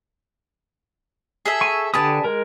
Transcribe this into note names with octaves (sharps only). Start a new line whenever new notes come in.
G#4 A4 E5
G#5 C#6
D3 G4 B4 G#5 A5 D#6
G#3 A#4